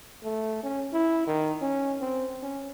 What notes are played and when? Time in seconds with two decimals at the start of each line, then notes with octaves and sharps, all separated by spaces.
0.24 A3
0.63 C#4
0.93 E4
1.27 D#3
1.62 C#4
2.01 C4
2.43 C#4